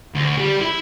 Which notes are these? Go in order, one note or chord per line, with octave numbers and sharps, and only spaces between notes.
D2
G3 G4
E4